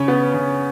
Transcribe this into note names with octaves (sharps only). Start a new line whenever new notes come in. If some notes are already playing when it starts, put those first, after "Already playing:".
Already playing: C#3 C#4 C#5
B3
C#3